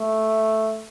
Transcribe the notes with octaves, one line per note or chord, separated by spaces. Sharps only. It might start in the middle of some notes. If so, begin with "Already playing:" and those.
Already playing: A3